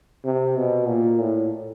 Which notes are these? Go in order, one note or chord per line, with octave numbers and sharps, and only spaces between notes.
C3
B2
A#2
A2